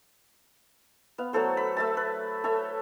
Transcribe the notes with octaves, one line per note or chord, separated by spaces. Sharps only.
B3 F5
F#3 A3 A4 C5
B5
A3 E5 A5
B4
A4 C#5 E5